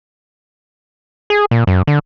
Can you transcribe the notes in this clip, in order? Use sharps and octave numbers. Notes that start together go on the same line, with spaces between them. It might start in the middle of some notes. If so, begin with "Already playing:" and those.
G#4
A#2
F#2
D3